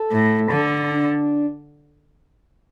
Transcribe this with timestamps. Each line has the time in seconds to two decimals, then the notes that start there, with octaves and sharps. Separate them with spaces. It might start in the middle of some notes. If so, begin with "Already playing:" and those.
Already playing: A4
0.11 A2
0.50 D3
0.91 D4